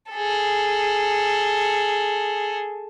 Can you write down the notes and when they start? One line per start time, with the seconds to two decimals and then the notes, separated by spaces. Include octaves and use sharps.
0.11 G#4 A4